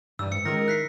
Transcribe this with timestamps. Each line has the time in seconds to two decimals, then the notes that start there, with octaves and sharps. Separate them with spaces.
0.19 G2 E3 G3 E6
0.31 G#2 E6 C#7
0.45 D#3 G#3 C#4 F4 A#4 A#6
0.68 E4 F#6 B6 C7